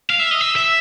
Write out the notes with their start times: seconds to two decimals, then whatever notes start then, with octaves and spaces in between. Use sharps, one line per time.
0.10 F5
0.19 E5
0.31 D#5
0.41 E5
0.56 E5